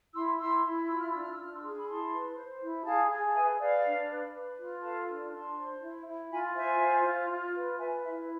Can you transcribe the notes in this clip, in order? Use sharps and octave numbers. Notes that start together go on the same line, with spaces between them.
E4 C6 E6
E4 C6 E6
E4
F4 E6
F6
D4 E6
F6
E6
D4 F6
C6 E6
G#4
B5
E4 A5 C6
B4
C5
E4
G#4 F5 A5
G#4
A5
B4 E5 G#5
B4 D5 F5
D4
B4
B4
F4
A4 F5 A5
D4
D4 A5 C6
C5
E4
E4
F4 G#5 B5
C5 E5 G#5
F4
F4
F4
B4
B4 E5 G#5
E4 E5